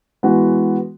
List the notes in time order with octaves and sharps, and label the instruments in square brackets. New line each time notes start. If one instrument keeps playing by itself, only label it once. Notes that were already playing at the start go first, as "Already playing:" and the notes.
[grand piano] E3 G#3 B3 F#4